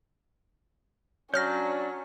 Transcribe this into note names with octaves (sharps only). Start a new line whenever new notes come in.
F#3 C#4 D4 C#5 D5 F6 G6 A#6